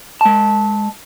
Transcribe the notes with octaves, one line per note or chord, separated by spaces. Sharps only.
G#3 A5